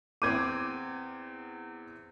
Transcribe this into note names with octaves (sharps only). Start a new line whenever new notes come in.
E2 C4 D6 G6 G#6 D#7